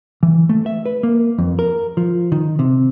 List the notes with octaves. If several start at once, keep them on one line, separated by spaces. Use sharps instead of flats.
E3
A3
E5
B4
A#3
F2
A#4
F3
D#3
C3